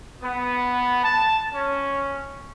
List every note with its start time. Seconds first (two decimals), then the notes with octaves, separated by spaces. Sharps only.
0.22 B3
1.04 A5
1.53 C#4